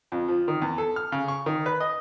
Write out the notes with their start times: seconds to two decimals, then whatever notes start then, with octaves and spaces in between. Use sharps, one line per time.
0.12 F2
0.28 F3
0.48 D#3
0.62 E2
0.78 A4
0.96 F6
1.12 C#3
1.28 C#6
1.46 D#3
1.66 B4
1.80 D#5